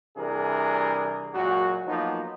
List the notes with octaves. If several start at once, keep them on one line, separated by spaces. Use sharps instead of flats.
C3 E3 G3 D4 G#4 A#4
F#2 A#2 C#3 G#3 F#4
F3 F#3 A#3 B3 D#4